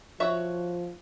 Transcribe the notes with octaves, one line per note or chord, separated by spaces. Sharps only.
F3 F#4 C#5 E5